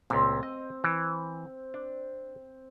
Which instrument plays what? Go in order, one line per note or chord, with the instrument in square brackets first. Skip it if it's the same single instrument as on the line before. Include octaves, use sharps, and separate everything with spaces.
[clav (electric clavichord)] C#2 A#2 [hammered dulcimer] C4
[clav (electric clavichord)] D#5
E3
D4